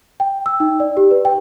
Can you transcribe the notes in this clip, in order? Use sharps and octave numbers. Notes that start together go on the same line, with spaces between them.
G5
E6
D#4
D5
G4
B4
G5